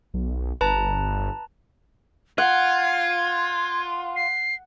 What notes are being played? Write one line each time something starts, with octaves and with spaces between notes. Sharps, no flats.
B1
G1 B4 A5 A#5
F4 F#5 G#6
C7